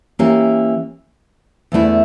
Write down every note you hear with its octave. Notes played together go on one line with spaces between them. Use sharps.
E3 A#3 C#4 G4 A#4
E2 D3 A3 E4